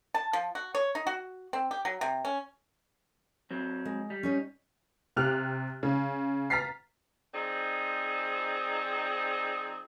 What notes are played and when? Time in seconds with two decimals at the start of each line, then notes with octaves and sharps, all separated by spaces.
0.14 A5
0.33 F3
0.55 F#4
0.75 C#5
0.95 D#4
1.07 F#4
1.53 C4
1.71 G4
1.85 F#3
2.01 C3
2.25 C#4
3.51 F#3 C4
3.85 G#3
4.10 G3
4.23 C#4 D#4 C#5
5.16 C3 G4 F6 F#6 F7
5.83 C#3
6.50 A#5 F6 A6 B6 C7
7.34 F3 C4 D#4 G#4 D5